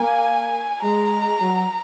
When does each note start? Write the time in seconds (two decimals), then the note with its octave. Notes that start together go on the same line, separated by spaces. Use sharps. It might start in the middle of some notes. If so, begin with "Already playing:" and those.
Already playing: A#3 G#5
0.82 G#3 A#5
1.39 F#3